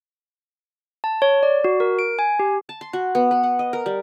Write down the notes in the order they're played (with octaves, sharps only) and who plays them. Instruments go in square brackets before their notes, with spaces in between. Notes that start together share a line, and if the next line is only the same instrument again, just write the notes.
[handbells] A5
C#5
D5
F#4
A#4
D7
G#5
G4
[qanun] A5
C6
F#4
B3
B4
F#5
D#5
A#4
G3